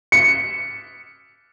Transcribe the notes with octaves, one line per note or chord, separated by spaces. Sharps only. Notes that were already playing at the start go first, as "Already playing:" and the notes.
C#7